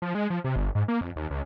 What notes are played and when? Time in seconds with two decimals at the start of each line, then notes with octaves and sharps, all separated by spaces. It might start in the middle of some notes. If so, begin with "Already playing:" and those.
0.02 F3
0.15 G#3
0.30 F3
0.44 C3
0.56 G1
0.75 G#2
0.88 A#3
1.01 F2
1.16 D#2
1.31 C#2